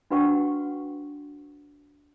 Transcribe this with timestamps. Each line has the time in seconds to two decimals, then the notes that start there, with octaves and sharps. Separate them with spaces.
0.11 D4 F#4 B4 F#5 G5 C#6